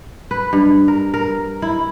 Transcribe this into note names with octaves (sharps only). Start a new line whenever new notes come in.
B4
G2
A#4
A#4
E4